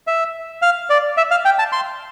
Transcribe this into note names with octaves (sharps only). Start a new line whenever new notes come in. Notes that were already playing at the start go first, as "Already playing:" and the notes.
E5
F5
D5
E5
F5
G5
A5
C6